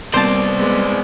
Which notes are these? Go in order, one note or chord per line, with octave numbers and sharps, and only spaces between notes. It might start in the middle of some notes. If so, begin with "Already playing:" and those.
C2 B2 A#3 C4 C5 D5 A5
G#3 B3